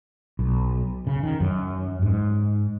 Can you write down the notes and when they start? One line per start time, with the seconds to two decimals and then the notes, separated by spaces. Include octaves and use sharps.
0.39 B1
1.07 C#3
1.23 D#3
1.40 F#2
2.02 G#2